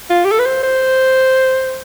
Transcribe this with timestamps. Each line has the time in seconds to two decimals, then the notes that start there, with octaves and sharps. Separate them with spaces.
0.10 F4
0.25 G4
0.32 A4
0.39 B4
0.46 C5
0.63 C5